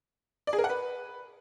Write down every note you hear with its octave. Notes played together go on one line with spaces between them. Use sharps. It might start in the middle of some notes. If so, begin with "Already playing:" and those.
D5
G#4
A#4
F#5
B4